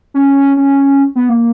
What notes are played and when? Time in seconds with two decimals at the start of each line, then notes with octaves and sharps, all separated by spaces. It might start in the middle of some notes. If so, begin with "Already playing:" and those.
0.14 C#4
0.57 C#4
1.15 B3
1.29 A#3